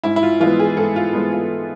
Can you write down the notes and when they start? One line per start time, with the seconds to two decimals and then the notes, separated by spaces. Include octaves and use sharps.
0.03 G#2 E4
0.16 E4
0.23 F4
0.40 E3 G#3 B3 F4
0.59 G#4
0.77 G#2 A4
0.96 F4
1.13 E3 G#3 B3
1.32 F4